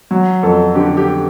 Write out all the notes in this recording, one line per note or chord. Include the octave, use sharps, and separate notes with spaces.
F#3
F2 A4
D3 G4
G4